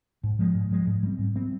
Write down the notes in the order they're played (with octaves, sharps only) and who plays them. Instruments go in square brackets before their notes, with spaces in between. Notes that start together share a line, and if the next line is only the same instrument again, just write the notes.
[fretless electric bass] G#2
F3 G#3
G#2
F3 G#3
G#2
G3 C4
G#2
G3 C4